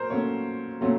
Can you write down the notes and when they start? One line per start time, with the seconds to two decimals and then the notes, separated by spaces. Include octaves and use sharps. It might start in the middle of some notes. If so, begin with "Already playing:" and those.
Already playing: A#2 F#3 A#4 C5
0.10 A#2 F#3 A3 C#4 C#5
0.81 A#2 F#3 A3 C#4